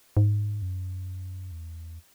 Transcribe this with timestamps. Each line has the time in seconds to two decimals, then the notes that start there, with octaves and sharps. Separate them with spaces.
0.17 G#2
0.62 F#2
1.51 E2